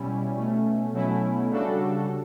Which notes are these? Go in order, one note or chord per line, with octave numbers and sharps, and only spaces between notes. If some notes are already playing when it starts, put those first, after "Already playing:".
Already playing: B2 G3 C#4 E4
B2 A3 C#4
B2 F#3 A3 C#4 E4
C#3 G3 D4 F#4 A4